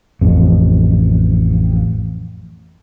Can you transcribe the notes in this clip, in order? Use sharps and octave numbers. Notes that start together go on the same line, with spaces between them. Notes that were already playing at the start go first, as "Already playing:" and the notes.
A1 F2